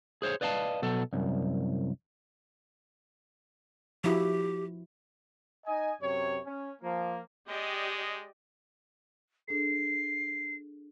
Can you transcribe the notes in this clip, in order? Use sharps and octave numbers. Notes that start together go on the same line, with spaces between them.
G#4 C5 C#5
B4 D5 D#5 F5 G5 A5
B2 F#3 A4
C2 F#2
F3 E4 F#4 G4
D#4 D#5 G#5
F#2 C3 C#5
C#4
F3 A#3
G#3 G4 D5 D#5
D4 G#4 A4 C7